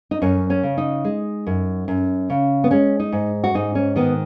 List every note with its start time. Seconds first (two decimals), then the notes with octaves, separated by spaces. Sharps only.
0.11 D#4
0.22 F#2 C#4
0.50 C#4
0.63 C#3
0.78 D#4
1.04 G#3
1.46 F#2
1.88 F#2
2.30 C#3
2.64 B3
2.71 G#3 C#4
2.99 D#4
3.12 G#2
3.44 F#4
3.54 G#2 D#4
3.75 C#4
3.96 D#3 B3